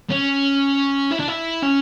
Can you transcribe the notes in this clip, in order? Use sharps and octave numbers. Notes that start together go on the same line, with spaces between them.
C#4
E4
D4
E4
C#4